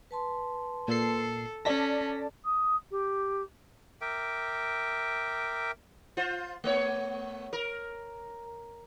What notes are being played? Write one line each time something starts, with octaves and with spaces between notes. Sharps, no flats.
B4 A5 C6
A#2 A4 C7
C#4 A4 D5 A5 A#6 B6
D#6
G4
A#4 E5 G5 D6
F4 C5
A3 B3 C#5
A#4